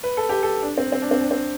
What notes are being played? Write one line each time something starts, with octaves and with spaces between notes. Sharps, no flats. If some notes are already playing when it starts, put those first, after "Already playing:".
B4
A4
G4
A4
D4
C4
C4
D4
C4
D4
C4